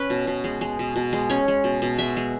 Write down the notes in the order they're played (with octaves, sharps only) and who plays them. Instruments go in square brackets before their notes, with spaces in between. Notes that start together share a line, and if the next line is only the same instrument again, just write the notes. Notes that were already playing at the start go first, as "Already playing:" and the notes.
Already playing: [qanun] C#4 B4
B2
B2
G#3
G#3
B2
B2
G#3
C#4 C#5
G#3
B2
B2
G#3 E5
G#3